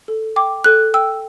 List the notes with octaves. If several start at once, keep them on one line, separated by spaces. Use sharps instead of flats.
A4
G5 D6
A4 F#6
G5 E6